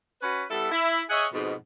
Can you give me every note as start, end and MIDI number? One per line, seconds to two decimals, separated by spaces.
0.22 0.43 61
0.22 0.43 66
0.22 0.43 71
0.50 0.67 55
0.50 0.67 59
0.50 0.67 64
0.50 0.67 69
0.71 1.02 64
1.10 1.26 68
1.10 1.26 73
1.10 1.26 75
1.10 1.26 76
1.10 1.26 78
1.32 1.54 41
1.32 1.54 44
1.32 1.54 47